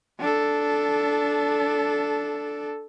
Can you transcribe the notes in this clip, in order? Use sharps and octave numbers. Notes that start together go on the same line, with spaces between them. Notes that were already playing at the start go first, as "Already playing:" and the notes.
D4 A4